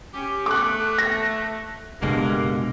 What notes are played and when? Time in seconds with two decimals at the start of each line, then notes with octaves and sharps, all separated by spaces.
0.14 C#4 G4
0.46 A3 D6 F#6
0.98 A#6
2.02 F#1 G2 B2 D3 G#3 A#3